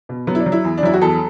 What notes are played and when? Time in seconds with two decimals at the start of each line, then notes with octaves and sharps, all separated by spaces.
0.09 B2
0.27 F#3 B3
0.35 E4
0.40 D4
0.46 F#3
0.52 E4
0.64 E2
0.78 D4
0.83 F#3 E4
0.94 F#4
1.02 E2 A4